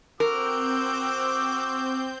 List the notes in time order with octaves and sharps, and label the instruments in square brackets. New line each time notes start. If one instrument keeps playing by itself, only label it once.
[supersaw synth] C4 G6 [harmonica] F#4 D6 E6 [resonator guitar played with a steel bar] A#4